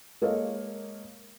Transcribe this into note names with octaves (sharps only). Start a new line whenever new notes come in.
G#3 A#3 A4 C#5 D#5 F5